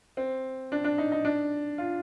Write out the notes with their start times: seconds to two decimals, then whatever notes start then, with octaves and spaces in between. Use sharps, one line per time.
0.17 C4
0.72 D4
0.84 D4
0.98 D#4
1.12 D#4
1.25 D4
1.78 F4